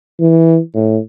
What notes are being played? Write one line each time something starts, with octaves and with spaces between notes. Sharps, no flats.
E3
A2